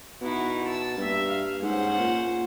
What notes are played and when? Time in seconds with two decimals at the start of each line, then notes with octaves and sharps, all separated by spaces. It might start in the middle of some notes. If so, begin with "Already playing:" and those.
0.21 B2 D#4 E4 F#4
0.65 A5 E6
0.98 G2 A#3 E5
1.28 F5
1.62 G#2 C#4 C5 F#5
1.99 A#2